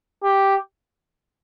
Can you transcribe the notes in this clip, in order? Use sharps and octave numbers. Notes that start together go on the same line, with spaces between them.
G4